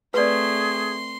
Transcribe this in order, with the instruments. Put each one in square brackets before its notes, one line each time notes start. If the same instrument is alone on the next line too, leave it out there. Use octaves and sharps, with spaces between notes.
[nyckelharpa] A3 C4 [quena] G#4 [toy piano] B4 D5 [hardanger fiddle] C6